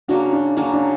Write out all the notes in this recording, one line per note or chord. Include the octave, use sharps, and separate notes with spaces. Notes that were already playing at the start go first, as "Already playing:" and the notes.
C#3 F#3 A#3 D4 F#4
D4
C#3 F#3 A#3 D4
D4